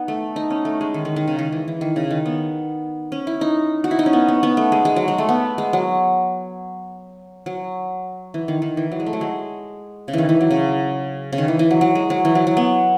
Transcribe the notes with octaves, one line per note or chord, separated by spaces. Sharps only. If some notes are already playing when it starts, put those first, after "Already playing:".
Already playing: B3 D#4
A3
D#4
C#4
A3
G#3
D#3
D#3
D#3
C#3
D#3
E3
E3
D#3
C#3
D#3
B3
C#4
E4
D#4
F#4
E4
D#4
C#4
B3
B3
B3
A3
G#3
G#3
F#3
G#3
A3
B3
G#3
F#3
F#3
E3
D#3
D#3
E3
F#3
G#3
A3
F#3
G#3
C#3
D#3 E3
E3
F#3
C#3
C#3
D#3
E3
E3
F#3
F#3
G#3
F#3
E3
F#3
F#3
B3